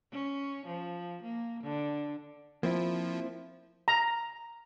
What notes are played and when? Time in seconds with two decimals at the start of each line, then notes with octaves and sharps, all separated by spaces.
0.12 C#4
0.66 F3
1.23 A#3
1.64 D3
2.63 F3 A#3 C4 E4
3.88 A#5